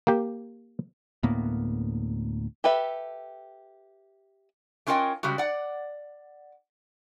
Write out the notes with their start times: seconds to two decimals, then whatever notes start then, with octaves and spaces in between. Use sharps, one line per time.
0.07 A#3 G4
1.23 D2 A2 A#3 B3
2.64 G4 A4 B4 E5
4.87 A3 C#4 F4 A#4 D#5 G5
5.23 C#3 G3 G#3 F#4
5.38 D5 F#5